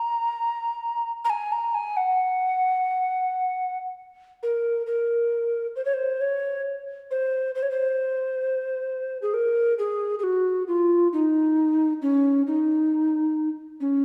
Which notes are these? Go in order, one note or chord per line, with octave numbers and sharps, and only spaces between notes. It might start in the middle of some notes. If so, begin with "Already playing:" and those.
Already playing: A#5
A#5
G#5
A#5
G#5
F#5
A#4
A#4
C5
C#5
C5
C#5
C5
C5
C#5
C5
G#4
A#4
G#4
G#4
F#4
F4
D#4
C#4
D#4
C#4